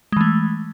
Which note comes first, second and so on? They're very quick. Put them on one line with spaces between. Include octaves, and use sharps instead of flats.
G#3 E3 A3